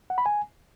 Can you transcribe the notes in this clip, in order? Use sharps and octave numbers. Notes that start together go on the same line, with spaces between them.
F#5
B5
G#5